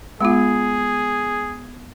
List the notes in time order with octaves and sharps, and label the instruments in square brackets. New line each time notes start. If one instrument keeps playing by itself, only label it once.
[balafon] G#3 F4 [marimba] B3 F#5 [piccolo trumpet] G#4